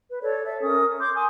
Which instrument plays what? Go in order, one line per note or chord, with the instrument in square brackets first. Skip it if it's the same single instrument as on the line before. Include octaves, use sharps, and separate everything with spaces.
[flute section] B4
A4 C#5 D5
A4 E5
C#4 A#4 D#6
C6 D6 G6
G#5 C6 D#6